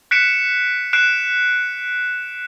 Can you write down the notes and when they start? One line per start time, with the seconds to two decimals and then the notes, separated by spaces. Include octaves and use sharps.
0.11 F#6 B6 C#7 D7 E7
0.93 F#6 C7 D7 E7